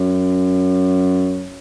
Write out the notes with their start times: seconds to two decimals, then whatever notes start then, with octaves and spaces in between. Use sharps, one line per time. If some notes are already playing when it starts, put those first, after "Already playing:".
Already playing: F#2